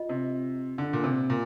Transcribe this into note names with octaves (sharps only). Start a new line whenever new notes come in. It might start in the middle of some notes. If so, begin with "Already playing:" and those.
Already playing: F4 D#5
C3
D3
A#2
C3
A#2